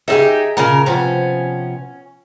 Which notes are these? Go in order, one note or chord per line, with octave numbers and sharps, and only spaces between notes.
D#4 E4 G4 G#4 D#5 E5
A#2 C#3 A#4
C3 F3 B3 C#4